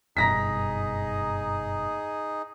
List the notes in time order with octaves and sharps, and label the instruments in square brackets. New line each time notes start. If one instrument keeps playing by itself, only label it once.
[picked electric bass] F#1 G2 B2 [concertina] D#4 G#4 [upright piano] A#5 A#6 B6